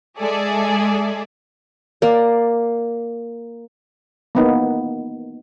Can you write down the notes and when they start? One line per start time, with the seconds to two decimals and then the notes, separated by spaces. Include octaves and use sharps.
0.18 G#3 G#4 A4 D5 E5
2.02 A#3 D5
4.35 A#3 B3 D#4